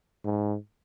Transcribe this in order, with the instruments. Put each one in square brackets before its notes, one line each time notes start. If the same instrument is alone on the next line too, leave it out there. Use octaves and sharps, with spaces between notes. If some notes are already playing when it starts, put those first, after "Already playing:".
[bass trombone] G#2